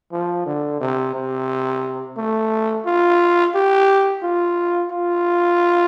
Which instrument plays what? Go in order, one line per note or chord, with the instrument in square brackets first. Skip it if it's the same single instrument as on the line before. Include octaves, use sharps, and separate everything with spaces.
[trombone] F3
D3
C3
C3
A3
F4
G4
F4
F4